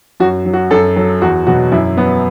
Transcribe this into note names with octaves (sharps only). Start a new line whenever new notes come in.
F#2 F#4
F#3
F#4
F#2 A4
F#3 A4
E2 F#4
B2 F#3 F#4
F#2 E4
F#3 B3